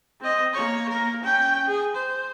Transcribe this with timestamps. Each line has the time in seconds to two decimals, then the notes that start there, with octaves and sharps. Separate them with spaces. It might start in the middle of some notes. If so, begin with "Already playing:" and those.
0.21 C4 D#5
0.53 A#3 C#5
0.89 A#3 A#4
1.23 C#4 G5
1.66 G#4
1.95 C5